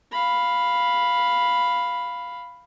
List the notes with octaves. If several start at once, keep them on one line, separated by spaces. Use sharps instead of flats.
F5 B5